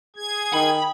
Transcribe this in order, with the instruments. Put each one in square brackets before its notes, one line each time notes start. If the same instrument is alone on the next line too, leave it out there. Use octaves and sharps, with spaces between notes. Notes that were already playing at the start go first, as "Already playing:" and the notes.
[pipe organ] G#4 G#6
[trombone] D#3 [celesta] G5 D#6 [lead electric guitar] B5